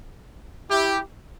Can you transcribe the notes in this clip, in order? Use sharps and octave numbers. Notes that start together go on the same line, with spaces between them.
E4 G4